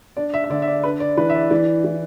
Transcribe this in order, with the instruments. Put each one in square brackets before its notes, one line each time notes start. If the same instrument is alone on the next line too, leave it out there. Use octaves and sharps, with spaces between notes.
[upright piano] D4 D5
E5
E5
D3 D5
E5
D5
D4 B4
D5
E3 B4
E5
D5
E3 D5
E3